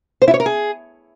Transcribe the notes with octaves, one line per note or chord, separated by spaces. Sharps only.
C5
E4
C#5
A#4
G#4